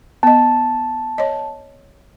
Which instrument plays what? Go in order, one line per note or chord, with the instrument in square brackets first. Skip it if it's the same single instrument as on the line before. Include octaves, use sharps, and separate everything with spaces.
[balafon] B3 D#5 [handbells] A5
[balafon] C#5 D#5